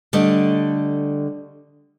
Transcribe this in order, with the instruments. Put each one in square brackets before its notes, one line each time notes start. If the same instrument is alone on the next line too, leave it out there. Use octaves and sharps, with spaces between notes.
[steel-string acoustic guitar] D3 G3 A3 D5 D#5